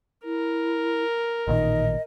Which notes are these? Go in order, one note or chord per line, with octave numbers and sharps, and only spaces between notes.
E4 A#4
A1 A#2 D#3 D#4 D#5